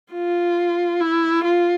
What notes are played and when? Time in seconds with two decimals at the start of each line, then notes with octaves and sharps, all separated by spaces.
0.12 F4
1.00 E4
1.44 F4